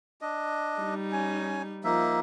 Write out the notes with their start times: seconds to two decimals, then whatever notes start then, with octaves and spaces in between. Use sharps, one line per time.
0.21 D4 D#5
0.80 G3 D#4
1.12 C#4 G#5
1.84 F3 A#3 D#4 E5